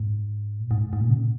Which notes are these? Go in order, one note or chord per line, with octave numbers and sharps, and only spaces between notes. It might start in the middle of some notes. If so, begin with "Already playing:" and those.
Already playing: G#2
A#2
G#2
G#2
A#2
C#3
A#2